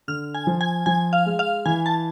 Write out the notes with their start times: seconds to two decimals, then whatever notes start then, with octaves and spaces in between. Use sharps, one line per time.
0.08 D3 F6
0.35 G#5
0.47 F3
0.61 G#5
0.86 F3 G#5
1.13 F5
1.26 G#3
1.39 F5
1.65 E3 G#5
1.86 A5